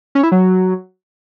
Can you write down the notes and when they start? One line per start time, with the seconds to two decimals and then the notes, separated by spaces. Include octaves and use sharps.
0.15 C#4
0.23 E4
0.32 F#3